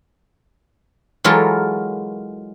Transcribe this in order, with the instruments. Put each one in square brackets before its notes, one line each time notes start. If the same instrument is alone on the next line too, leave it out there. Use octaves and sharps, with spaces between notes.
[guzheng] E3 F#3 G#3 F4 A4 A#4